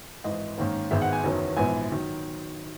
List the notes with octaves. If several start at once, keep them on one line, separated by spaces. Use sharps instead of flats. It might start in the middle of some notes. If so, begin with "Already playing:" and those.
G#1 G#2 E3 D#5
G#2 D#3 A#3 C#4
G#1 G#2 D#3 G#3 B3 E5
F#5
G#5
F#1 E2 D#3 F#3 C#4
A#1 G#2 E3 B3 G#5
D#3 F#3